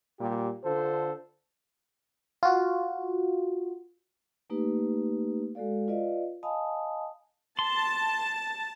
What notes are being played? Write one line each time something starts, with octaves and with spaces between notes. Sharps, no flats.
A#2 G3 G4
D3 D4 F4 A4 C5
F4 F#4
A3 A#3 D#4 G4 B4
G#3 F#4 A4 D5 F5
F4 B4 D5 D#5 F5
D#5 F5 G#5 A5 B5 D#6
A5 C6